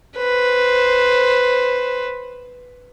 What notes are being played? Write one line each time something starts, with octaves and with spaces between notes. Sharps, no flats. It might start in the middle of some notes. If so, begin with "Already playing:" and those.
B4 C5